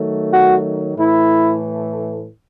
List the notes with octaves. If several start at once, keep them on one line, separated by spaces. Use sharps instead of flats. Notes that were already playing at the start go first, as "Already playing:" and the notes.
Already playing: D#3 F#3 A3
F#4
A2 E3 A3 E4